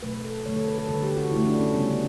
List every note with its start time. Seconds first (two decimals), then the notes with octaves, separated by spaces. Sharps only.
0.03 B2 F#3 A3 B4
0.24 A4
0.46 D3 F#3 A3 C#5
0.56 A4
0.68 B4
0.78 A4
0.88 D3 G3 B4
1.03 G4
1.17 F#4
1.31 D3 A3 E4
1.46 D4
1.60 C#4
1.74 C#3 G3 B3